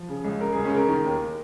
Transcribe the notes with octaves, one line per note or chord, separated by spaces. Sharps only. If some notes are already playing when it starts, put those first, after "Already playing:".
Already playing: F3
C#3
C#2
C#3 A#4
C#2 G#4
C#4
C#3 A#4
D#3
D#2